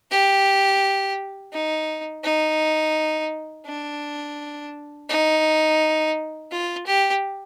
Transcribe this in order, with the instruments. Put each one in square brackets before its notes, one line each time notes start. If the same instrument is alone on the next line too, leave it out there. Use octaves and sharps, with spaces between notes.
[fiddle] G4
D#4
D#4
D4
D#4
F4
G4